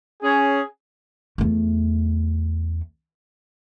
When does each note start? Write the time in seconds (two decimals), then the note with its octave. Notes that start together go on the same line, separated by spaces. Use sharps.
0.23 C#4 G#4
1.38 E2 A3